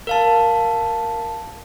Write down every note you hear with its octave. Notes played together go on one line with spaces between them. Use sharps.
A#4 F5 A5